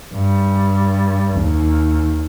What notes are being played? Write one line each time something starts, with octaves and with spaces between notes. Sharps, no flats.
G2
D#2